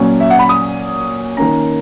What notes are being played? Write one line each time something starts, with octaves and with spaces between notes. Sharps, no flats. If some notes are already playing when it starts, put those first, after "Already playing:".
Already playing: A#2 F#3 C#4
E5
F#5
B5
D#6
D#3 A#3 C#4 A#5